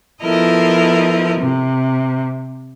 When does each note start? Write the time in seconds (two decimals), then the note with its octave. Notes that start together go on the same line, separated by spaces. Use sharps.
0.22 F3 B3 E4 A4 A#4 D#5
1.40 C3